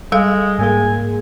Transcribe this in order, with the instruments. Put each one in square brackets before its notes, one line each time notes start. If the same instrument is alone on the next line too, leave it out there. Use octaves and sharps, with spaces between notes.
[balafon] G3 A4 F5 [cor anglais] G#3
[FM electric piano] G#2 A#3 G#4 [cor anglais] G#5